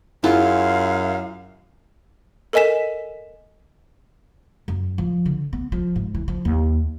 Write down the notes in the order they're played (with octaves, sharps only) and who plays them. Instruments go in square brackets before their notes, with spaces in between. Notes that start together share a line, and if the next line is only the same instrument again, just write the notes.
[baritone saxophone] F#2 [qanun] E4 F4 G#4 [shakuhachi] F5
[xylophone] A4 A#4 D#5 G#5 B6 E7
[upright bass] F#2
F3
D3
B3
F3
G#2
E3
F3
D#2